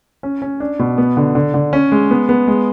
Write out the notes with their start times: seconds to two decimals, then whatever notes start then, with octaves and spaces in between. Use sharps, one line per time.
0.23 C#4
0.42 C#4
0.60 D4
0.79 B2
0.98 B3
1.17 D3
1.35 D3
1.54 D3
1.73 C#4
1.92 G#3
2.11 B3
2.29 B3
2.47 G#3